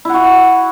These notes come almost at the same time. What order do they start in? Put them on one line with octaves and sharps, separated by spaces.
E4 F#5 F#4